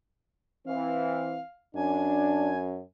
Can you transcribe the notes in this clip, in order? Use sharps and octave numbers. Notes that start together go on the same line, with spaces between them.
E3 C4 F5
F#2 D4 G#5